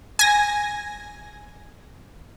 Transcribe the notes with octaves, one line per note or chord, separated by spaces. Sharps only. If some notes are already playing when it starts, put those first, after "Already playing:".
G#5 A#6